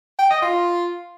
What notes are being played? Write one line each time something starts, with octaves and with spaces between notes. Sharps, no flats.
G5
D#5
F4